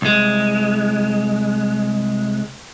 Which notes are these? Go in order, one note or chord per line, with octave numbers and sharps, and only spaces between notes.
C2 G#3